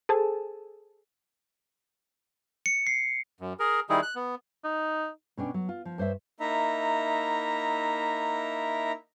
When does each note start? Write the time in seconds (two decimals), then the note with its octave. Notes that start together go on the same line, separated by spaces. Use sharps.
0.09 G#4 A4 C5 G#5 A5
2.66 C#7
2.87 C7
3.40 F#2
3.59 G#4 A#4
3.90 D#3 G3 D#4 E4 G#4
4.02 F#6
4.15 B3
4.64 D#4
5.37 B2 C#4 D4 G5
5.54 F#3
5.69 F4
5.85 F3
5.98 G2 C5 C#5 E5
6.40 A#3 D#4 E4 E5 A#5